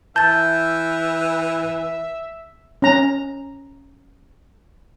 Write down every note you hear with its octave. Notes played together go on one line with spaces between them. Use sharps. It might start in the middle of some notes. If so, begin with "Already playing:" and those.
E3 E5 A5 G6 A6
C#4 A#5